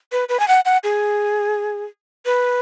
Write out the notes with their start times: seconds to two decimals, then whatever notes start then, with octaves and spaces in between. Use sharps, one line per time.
0.12 B4
0.29 B4
0.40 G#5
0.48 F#5
0.65 F#5
0.84 G#4
2.25 B4